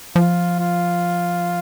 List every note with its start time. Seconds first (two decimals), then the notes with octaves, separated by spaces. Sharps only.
0.16 F3 F4
0.59 F4